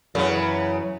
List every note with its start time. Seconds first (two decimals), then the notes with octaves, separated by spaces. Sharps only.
0.15 F#2 C#3 E3 B3